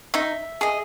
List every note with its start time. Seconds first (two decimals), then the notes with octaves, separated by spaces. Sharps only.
0.14 D#4 E5
0.61 G#4 D#5